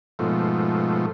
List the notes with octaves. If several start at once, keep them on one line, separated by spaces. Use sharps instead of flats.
G#2 B2 F3 A3